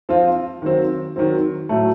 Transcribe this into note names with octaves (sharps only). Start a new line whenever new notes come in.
F3 C4 F4
D#3 F#3 C4
D#3 F#3 C4
A2 F#3 A3